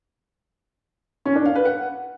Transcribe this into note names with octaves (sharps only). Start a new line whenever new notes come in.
C#4
D4
F5
B4
F#5